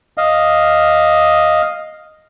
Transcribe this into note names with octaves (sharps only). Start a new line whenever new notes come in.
D#5 F5